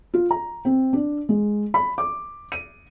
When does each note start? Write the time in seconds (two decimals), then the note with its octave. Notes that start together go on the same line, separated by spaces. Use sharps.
0.14 F4
0.31 A#5
0.65 C4
0.93 D4
1.29 G#3
1.74 B5
1.98 D6
2.52 D#7